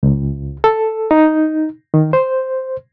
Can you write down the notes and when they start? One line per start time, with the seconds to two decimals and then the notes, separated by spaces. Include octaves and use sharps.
0.03 C#2
0.64 A4
1.11 D#4
1.94 D#3
2.13 C5